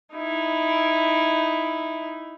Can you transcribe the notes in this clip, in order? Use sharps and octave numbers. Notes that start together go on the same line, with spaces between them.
D#4 E4